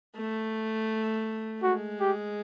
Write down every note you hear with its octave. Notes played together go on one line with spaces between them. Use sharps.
A3
G#3 F#4
G4